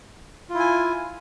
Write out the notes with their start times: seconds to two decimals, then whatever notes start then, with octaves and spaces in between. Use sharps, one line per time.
0.50 F4
0.55 E4
0.60 G#5